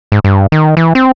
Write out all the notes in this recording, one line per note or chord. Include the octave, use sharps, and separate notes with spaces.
G#2
G2
D#3
E3
C4